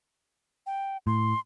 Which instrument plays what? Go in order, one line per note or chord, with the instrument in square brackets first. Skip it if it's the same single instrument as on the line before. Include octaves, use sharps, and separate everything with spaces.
[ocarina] G5
[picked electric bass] A2 [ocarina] C6